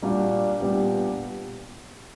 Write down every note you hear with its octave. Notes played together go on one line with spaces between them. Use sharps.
A#2 G3 A#3 D4 F#4
A#2 G3 B3 D4 G4